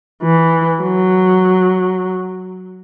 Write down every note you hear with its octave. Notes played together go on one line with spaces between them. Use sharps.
E3
F#3